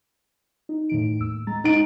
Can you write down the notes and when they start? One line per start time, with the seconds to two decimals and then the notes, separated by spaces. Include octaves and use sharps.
0.69 D#4
0.89 A2 D#3 D7
1.19 D#2 E6
1.47 G#3 A#5 A6
1.64 D#4 D7